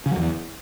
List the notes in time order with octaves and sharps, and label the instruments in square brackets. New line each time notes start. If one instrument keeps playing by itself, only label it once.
[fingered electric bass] C#3
F#3
E2